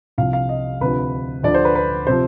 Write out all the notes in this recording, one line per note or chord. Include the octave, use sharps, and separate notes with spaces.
C2 C3 F3 F5
F5
D#5
D2 C3 F3 B4
D2 D3 F3 D5
C5
B4
B4
C3 F3 C5